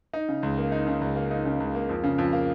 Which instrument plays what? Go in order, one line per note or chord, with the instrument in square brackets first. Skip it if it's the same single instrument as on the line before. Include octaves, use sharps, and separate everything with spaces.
[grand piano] D#4
C#3
C#2
A#3
D#4
C#3
C#2
A#3
D#4
C#3
C#2
A#3
F2
C#3
F2
A#3